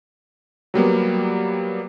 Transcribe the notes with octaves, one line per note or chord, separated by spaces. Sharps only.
F#3 G3 A#3 B3